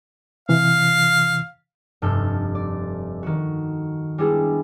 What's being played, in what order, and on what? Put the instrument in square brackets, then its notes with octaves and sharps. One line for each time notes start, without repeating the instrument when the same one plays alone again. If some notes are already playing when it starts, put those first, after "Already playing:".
[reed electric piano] C3 E3 [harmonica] F5
[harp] F1 G2 A4 F6 G6
D5
D#3 F#4
G3 G#3 B3 D4 E4 G#4